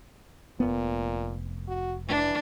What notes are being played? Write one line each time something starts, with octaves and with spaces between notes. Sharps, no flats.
F1 D#2 A#2 B3
F#4
E3 D4